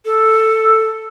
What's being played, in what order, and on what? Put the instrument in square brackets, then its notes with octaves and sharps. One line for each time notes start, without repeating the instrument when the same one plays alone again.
[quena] A4